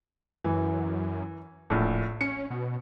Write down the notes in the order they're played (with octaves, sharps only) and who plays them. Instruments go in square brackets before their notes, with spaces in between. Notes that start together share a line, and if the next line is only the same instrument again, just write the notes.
[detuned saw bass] F#2 [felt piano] E3
[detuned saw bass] D1 [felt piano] A#1 A2
[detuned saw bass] C#4 [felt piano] C#7
[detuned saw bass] B2